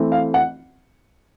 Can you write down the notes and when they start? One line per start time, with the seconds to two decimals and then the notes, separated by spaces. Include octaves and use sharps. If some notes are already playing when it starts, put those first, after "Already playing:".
Already playing: E3 A3 C4
0.12 F5
0.34 F#5